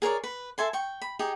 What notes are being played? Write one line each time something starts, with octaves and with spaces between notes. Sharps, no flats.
G#4 A#4 C#5 D5
B4
A4 E5 G#5 C6
G5 C#6
B5
D#4 G4 G#4 G5